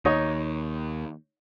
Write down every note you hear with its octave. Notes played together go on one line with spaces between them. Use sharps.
D#2 D#4 C#5